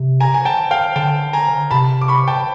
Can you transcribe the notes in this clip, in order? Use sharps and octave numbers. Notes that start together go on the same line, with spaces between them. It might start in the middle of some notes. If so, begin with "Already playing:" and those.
Already playing: C3
G#5 A#5
G#5
G5 A5
F5 G5
D3 G5 A5
G#5 A#5
C3 A5 B5
D6
B5 C#6
G5 A5